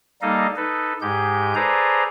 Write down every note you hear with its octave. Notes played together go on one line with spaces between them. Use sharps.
G3 A#3 D#4 A4 D#5 F5
D#4 A4 B4
G#2 G#3 G4 G6
G#4 A4 B4 C5 D5 A#5